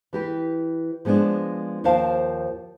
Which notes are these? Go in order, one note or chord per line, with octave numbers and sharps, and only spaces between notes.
E3 G4 B4
F3 G#3 B3 C4 D4
D#2 F3 A#4 C5 F5 A5